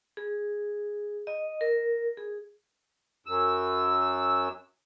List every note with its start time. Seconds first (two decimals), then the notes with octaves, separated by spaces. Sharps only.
0.17 G#4
1.27 D#5
1.61 A#4
2.17 G#4
3.26 F#2 E6